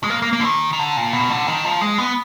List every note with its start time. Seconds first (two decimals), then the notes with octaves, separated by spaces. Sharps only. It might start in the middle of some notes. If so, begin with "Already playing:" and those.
0.04 G#3
0.10 A#3
0.22 A#3
0.33 A#3
0.40 D3
0.44 D#3
0.73 D#3
0.79 D3
0.97 A#2
1.13 B2
1.30 D3
1.47 D#3
1.65 F3
1.81 G#3
1.98 B3